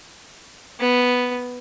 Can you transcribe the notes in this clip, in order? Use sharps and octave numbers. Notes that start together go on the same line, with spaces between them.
B3